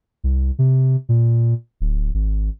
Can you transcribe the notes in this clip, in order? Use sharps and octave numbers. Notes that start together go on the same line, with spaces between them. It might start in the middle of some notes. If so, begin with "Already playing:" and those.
C2
C3
A#2
D1
G#1